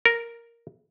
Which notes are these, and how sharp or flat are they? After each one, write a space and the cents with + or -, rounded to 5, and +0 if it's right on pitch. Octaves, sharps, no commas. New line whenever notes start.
A#4 +0